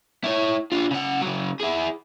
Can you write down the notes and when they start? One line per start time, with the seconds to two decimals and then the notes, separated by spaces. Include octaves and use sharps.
0.24 E4 C#5
0.72 D4 F4
0.91 C#3 F#5
1.22 C#3 F#3
1.61 E4 G#4